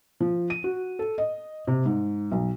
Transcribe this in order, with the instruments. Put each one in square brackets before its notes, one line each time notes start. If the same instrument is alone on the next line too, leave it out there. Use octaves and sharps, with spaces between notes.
[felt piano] F3
D#7
F#4
A4
D#5
C3
G#2
B1